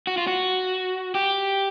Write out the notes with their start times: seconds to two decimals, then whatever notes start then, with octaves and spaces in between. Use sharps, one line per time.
0.07 F#4
0.18 F4
0.27 F#4
1.15 G4